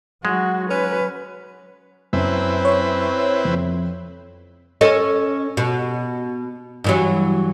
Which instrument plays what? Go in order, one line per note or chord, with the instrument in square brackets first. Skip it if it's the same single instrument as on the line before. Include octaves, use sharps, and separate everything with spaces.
[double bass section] F#3 [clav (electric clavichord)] G#3 [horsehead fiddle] F#4
[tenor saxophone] C#4 [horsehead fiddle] B4
[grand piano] F#2 [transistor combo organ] C4 E4 B4
[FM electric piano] C#5
[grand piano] F2
[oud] C#4 A4 D#5
B2
G2 E3 F#3